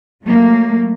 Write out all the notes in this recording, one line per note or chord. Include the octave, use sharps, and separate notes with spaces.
F#3 A3 A#3